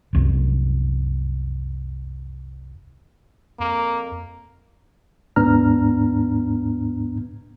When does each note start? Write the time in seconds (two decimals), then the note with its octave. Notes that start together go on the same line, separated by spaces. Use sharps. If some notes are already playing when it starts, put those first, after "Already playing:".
0.13 F1 C2 F#2
3.60 F2 A#3
5.36 D#2 G#2 B3 D4 A#5 F6